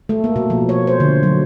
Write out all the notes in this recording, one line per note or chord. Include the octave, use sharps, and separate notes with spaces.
A3
A#3
B2
F3
C#5
C5
D3
F#3